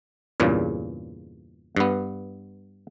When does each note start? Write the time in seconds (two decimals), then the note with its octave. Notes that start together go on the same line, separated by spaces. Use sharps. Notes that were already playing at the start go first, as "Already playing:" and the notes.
0.40 E2 G2 A#2 C#3
1.76 G2 B3